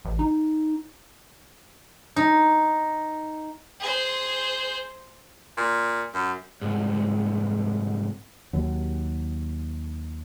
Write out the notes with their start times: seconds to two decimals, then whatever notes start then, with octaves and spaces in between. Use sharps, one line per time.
0.05 A1
0.19 D#4
2.16 D#4
3.80 G#4 C5
5.58 A#2
6.14 F#2
6.61 C2 G#2
8.53 D#2 F#3